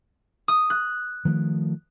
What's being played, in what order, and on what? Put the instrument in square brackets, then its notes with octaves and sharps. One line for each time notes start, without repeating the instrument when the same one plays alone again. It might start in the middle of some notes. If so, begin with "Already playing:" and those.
[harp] D#6
F#6
[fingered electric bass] D#3 F3 A3